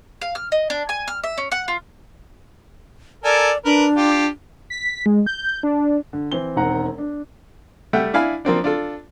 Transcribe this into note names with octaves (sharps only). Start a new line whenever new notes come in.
F5
F6
D#5
D4
G#5
F6
E5
C#4
F#5
F4
A4 A#4 D5 G#5
D4 A#4 B4
F4 G4
B6
G#3
G6
D4
D3
E3 C4 G7
E1 D#3 C4 F#5 A#5
D4
G3 A3 E5 F#5 G5
D4 E4 F5 G#5 B5
F3 A#3 C4 D4
D4 F4 A4